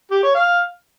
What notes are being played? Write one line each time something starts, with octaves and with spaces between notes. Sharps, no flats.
G4
C#5
F5